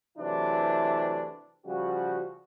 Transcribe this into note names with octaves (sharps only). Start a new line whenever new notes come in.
C3 E3 F#3 A3 D4 E4
C#3 F3 G3 F#4